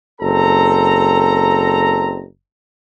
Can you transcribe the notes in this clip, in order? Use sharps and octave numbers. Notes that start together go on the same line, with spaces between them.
F#1 C4 A4 A#5